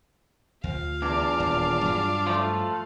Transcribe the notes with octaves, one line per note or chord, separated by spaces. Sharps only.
D2 F4 F5
E2 D4
D#1
G2 F#3
F3 A3